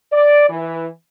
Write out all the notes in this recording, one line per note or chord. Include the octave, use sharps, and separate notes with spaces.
D5
E3